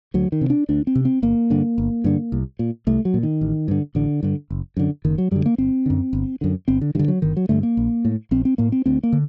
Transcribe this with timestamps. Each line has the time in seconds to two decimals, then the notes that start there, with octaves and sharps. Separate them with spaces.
0.14 D2 F#3
0.32 D#3
0.41 C3
0.50 D4
0.69 D2 D4
0.87 C4
0.95 C3
1.05 C4
1.22 G1 A#3
1.50 G2 D3
1.78 G1
2.04 G2 D3
2.32 C2
2.59 A#2
2.87 C2 A3
3.05 F#3
3.14 A#2
3.23 D#3
3.41 A1
3.68 G2 D3
3.95 A1 D3
4.23 G2 D3
4.50 F#1
4.77 F#2 D3
5.05 F#1 D#3
5.18 F#3
5.31 F#2 D3 G3
5.46 A#3
5.58 G1 C4
5.86 F#2 D3
6.13 G1
6.41 F#2 D3
6.68 G1 C4
6.81 D3
6.95 G2 D3 D#3
7.08 F#3
7.22 G1 D#3
7.37 F#3
7.49 G2 D3 A3
7.63 A#3
7.77 A#1
8.05 A2
8.31 A#1 C4
8.45 C4
8.58 A2 A#3
8.72 C4
8.86 D2 C4
9.03 A#3
9.13 D3